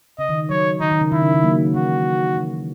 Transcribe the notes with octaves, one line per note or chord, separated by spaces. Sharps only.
C#3 D#5
D#3
F#3 C#5
D#3 D#4
D#3
C#3
D#3 E4
C#3
D#3
F#3 A#3
E3 F#4
E3